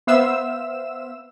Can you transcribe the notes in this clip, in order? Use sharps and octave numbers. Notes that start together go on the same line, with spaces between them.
B3 C5 E5 F5 E6 E7